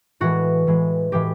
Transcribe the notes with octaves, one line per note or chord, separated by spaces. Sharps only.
A2 E3 G#3 F#4
A2 E3 G#3
A2 E3 G#3 G4